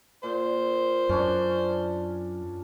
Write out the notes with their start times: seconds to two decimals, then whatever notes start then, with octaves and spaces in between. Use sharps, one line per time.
0.23 A#2 C5
1.09 F#2 C#4 D4